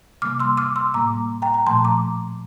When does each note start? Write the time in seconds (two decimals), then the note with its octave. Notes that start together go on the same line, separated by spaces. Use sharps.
0.22 C3 E3 G3 A#3 D6 F6
0.40 C6 E6
0.57 D6 F6
0.76 C6 E6
0.94 A2 G3 A#3 A#5 D6
1.42 G5 A#5
1.54 A#5
1.66 A#2 F3 A3 A5 C6
1.84 A#5 D6